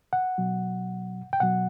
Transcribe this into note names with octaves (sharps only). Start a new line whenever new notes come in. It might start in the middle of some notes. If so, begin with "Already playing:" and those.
F#5
B2 F#3
G5
B2 F#3 F#5